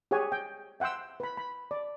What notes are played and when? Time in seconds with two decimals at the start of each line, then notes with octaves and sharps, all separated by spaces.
0.11 G4 G#4 C#5 F#5 G#5
0.32 G5
0.80 E5 F#5 G5 C6 E6
1.20 B4 B5
1.37 B5
1.71 D5